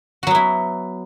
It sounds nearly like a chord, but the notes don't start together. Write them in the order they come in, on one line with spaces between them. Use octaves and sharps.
F#4 F#3 B3 E4